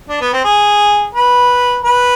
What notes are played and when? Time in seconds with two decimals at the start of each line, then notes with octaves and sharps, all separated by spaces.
0.09 D4
0.21 B3
0.33 C4
0.44 G#4
1.14 B4
1.85 B4